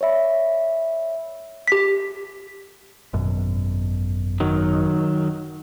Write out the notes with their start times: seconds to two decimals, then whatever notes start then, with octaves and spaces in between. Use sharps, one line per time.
0.01 C#5 D5 E5 B5
1.68 G4 B6
3.13 G#1 F#2 B2
4.40 D#3 F#3